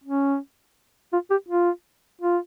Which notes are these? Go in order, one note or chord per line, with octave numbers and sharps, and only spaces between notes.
C#4
F4
G4
F4
F4